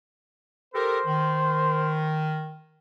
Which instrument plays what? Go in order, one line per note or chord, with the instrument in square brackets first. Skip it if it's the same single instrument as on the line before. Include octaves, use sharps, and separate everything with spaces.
[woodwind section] G4 A4 A#4 [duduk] C5
[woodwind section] D#3